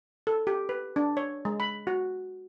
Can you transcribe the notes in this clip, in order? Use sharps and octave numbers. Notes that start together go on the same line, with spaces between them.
A4
G4
B4
D4
C#5
G#3
B5
F#4